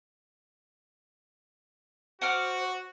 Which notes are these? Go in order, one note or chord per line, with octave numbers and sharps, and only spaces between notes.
F#4 C5 F#5 D6 F6